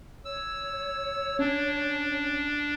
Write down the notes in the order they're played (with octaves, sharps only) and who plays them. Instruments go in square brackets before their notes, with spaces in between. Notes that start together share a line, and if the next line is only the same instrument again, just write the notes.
[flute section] C#5 [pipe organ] E6
[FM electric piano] C#4 [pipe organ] D4